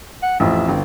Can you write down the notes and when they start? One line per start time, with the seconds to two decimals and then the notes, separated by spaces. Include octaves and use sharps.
0.23 F#5
0.40 A1 F2 E5
0.68 G1 C4